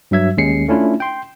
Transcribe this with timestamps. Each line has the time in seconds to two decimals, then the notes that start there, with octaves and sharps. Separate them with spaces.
0.11 G2 F#3 E5 G#6
0.37 D#2 G#3 C#4 C7 C#7
0.68 A3 C#4 D4 E4 F4
1.00 G5 C6